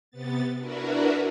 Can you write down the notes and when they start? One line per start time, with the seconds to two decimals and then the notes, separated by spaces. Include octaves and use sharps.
0.11 C3 B3 A6
0.58 D4 E4 F#4 A#4 B4